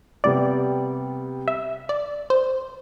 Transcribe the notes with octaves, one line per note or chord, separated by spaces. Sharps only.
C3 G3 B3 D5
E5
D5
C5